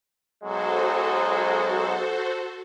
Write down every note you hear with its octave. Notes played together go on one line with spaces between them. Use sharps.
B1 F#3 G#3 F#4 A4 C5